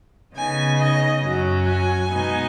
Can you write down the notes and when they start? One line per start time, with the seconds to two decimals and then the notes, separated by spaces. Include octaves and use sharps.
0.34 C#3 B3 D#4 G#5
0.79 D#5
1.22 F#2 F#3 C#4
1.66 G#5
2.10 B2 G#3 B3 D#4